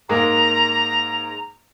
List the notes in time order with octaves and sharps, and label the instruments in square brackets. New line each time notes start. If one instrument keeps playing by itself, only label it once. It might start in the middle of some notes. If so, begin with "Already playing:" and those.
[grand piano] G#2 G#3 A#3 [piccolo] A#5